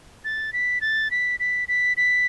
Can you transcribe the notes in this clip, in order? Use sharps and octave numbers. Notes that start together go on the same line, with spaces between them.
A6
B6
A6
B6
B6
B6
B6